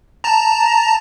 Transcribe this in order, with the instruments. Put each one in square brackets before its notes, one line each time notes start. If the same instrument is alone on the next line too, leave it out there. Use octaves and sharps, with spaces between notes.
[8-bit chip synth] A5 A#5